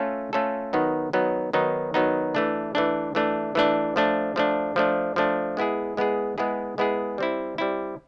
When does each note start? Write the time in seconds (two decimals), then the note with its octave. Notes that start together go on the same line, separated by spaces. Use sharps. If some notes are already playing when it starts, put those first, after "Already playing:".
Already playing: A3 C#4 F4 A4
0.33 A3 C#4 F4 A4
0.73 D#3 F#3 B3 D#4
1.13 D#3 F#3 B3 D#4
1.53 D#3 F#3 B3 D#4
1.94 D#3 F#3 B3 D#4
2.35 E3 A3 D4
2.75 E3 A3 D4
3.15 E3 A3 D4
3.55 E3 A3 D4
3.96 F3 A3 D4
4.36 F3 A3 D4
4.76 F3 A3 D4
5.16 F3 A3 D4
5.57 G#3 B3 E4 G#4
5.97 G#3 B3 E4 G#4
6.38 G#3 B3 E4 G#4
6.78 G#3 B3 E4 G#4
7.18 G3 C4 E4
7.58 G3 C4 E4